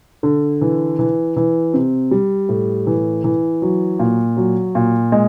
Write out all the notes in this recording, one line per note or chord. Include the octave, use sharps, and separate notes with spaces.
D3
E3
E3
E3
C3
G3
A2
E3
E3
F#3
A#2
F#3
A#2
G#3